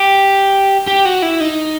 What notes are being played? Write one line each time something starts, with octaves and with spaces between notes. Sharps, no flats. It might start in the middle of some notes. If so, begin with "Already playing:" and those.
Already playing: G4
G4
F#4
E4
D#4